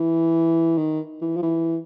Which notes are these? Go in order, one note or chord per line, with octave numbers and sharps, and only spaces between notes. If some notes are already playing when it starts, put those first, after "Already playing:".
Already playing: E3
D#3
E3
F3
E3